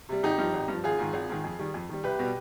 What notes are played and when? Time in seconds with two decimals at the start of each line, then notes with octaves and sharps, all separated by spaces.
0.09 C3 G3
0.23 G#1 D#4 G4
0.38 G2 F3
0.54 G#1
0.68 G2 F3
0.84 G#1 F4 G#4
0.99 G#2 D#3
1.13 G#1
1.29 G#2 D#3
1.44 F2
1.59 D#3 G3
1.74 F2
1.89 D#3 G3
2.03 C2 G4 B4
2.19 B2 G3